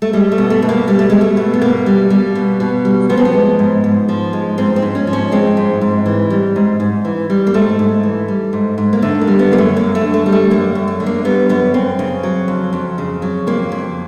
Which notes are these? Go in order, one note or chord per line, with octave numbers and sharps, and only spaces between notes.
A3
G3 G#3
A3
B2
A3
B2
A#3
G3 A#3
A3
G3 G#3
A3
B2
B3
B2 A#3
G3
G3
B2
B2
G3
F3 B3
C4
B3
G#3
G#2
G#2
F3
G#3
G#2 C4
C4
G#2
C#4
F3
C#4
G#3 C4
G#2
G#2
E3
G3
G#2
G#2
E3
G3
A#3
G#2 A3
G#2
E3
G3
G#2
G#2
A#3
D3 A3
A#3
G3
B3
F#2 A#3
A3
F#2 A#3
A3
D3
A3
G3
A3
F#2 A#3
F#2
A3
D3
A#3
G3 B3
F#2 B3
F#2 C4
C#3
F#3
F2
F2
C#3
F#3
F2 A#3
F2